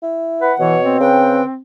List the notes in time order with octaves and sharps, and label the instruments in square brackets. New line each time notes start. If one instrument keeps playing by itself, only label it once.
[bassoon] E4
[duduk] B4 [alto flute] F#5
[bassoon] B2 [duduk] E3 [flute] C#5
[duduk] C4
[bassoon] C#3 [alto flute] B4 [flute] G5